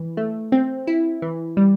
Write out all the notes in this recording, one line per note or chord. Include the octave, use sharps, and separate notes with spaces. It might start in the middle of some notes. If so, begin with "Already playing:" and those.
Already playing: E3
A3
C4
E4
E3
G3